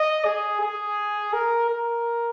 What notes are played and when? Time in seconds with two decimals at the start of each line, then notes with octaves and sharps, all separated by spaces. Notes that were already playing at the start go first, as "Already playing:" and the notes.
Already playing: D#5
0.25 G#4
0.61 G#4
1.33 A#4
1.69 A#4